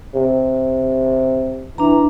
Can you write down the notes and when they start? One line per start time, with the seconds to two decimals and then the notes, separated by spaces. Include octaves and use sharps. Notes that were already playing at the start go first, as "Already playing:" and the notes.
0.15 C3
1.78 E3 D4 A#5